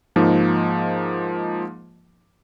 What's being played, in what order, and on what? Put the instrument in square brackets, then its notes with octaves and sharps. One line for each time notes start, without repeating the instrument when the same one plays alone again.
[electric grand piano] G#2 F3 A#3 D#4